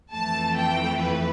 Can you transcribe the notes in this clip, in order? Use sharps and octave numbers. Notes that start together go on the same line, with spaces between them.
F2 E3 A3 A5
G5
B4